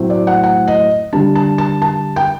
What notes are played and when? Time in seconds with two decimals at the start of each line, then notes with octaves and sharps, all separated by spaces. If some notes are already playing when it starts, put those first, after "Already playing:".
Already playing: A2 F#3 A3 C4
0.10 D5
0.27 F#5
0.43 F#5
0.68 D#5
1.13 D3 G3 D4 A5
1.35 A5
1.58 A5
1.82 A5
2.16 G5